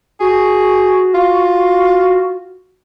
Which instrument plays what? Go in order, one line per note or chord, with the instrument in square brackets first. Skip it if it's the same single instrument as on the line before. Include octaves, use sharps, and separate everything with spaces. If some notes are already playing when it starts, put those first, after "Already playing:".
[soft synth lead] F#4 [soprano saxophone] G#4
[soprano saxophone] F4